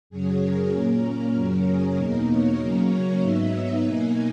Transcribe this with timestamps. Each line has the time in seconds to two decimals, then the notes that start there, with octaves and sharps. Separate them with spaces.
0.10 F#2 C#3 F#3 C#4 G#4
0.41 A#4
0.71 A#2 A#3 C#4
1.34 F#2 C#3 F#3 C#4 A#4
1.65 G#4
1.96 E2 B2 A#3 D#4 A#4
2.27 C#5
2.58 C#3 F#3 A#3 C#4 A#4
2.90 C#5
3.20 G#2 F#3 B3 D#4 E5
3.52 E5
3.83 B2 A#3 D#4 G#5